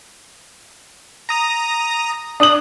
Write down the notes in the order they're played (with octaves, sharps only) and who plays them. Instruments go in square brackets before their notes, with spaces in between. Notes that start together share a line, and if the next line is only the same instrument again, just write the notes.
[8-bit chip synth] A#5 D#6 A#6
[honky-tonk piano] D4 F#7 [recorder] D#6